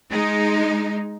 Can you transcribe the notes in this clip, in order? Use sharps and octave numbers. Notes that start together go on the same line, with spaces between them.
G#3 D#4